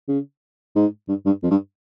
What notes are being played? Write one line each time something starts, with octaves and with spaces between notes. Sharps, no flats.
C#3
G#2
G2
G2
F2
G2